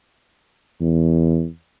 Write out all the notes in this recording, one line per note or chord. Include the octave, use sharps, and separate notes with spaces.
E2